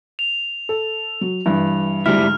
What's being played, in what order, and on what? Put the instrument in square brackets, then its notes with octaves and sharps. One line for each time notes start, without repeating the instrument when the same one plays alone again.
[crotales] F7
[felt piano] A4
F#3
[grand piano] G2 [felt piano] E3
[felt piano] D2 G#2 [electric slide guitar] G3 E4 [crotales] F6